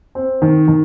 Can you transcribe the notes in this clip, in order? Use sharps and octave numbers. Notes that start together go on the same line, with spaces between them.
C4
D#3
D#3